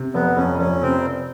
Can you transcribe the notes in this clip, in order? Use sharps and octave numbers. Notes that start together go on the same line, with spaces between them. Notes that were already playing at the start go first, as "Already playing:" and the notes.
Already playing: C3
F1 B3
F2 C#4
F1 C#4
C3 C4